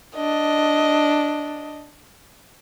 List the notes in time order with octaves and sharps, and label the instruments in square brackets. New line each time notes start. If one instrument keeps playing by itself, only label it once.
[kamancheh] D4 D#5